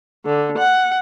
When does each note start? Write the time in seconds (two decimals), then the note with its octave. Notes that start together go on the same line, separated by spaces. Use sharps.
0.25 D3
0.58 F#5